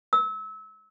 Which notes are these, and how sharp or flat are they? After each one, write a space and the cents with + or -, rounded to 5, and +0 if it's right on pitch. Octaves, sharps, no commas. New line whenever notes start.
E6 -30